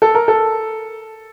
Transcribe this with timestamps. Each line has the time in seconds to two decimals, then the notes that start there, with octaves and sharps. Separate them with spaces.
0.02 A4
0.15 A#4
0.28 A4